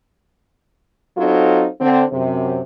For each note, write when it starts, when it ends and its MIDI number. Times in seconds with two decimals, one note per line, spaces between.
1.17 1.66 54
1.17 1.66 60
1.17 1.66 63
1.17 1.66 65
1.17 1.66 69
1.81 2.03 50
1.81 2.03 60
2.12 2.61 42
2.12 2.61 48